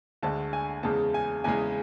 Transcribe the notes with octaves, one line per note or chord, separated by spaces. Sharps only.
D2 D3 G#3 A5
G#5
E2 C#3 G#3 A5
G#5
E2 C#3 G#3 G#5